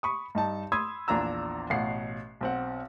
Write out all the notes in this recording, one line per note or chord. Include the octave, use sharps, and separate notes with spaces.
B5 C#6 D#6
G2 D#4 A5
B5 C6 D#6 E6 G#6
A#1 E2 D4 F4 A#5 E6
A1 B2 F5 F#5 C7
B1 C4 F#5